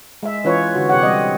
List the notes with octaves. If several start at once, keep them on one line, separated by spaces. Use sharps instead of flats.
G#3 E5
E3 C#4 F4 B4 C#5
D3 F#4
C3 G4 C#5 F#5
G3 C4 D#5